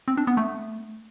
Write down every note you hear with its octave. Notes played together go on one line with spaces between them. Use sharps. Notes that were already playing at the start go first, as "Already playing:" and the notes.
C4
D4
B3
A3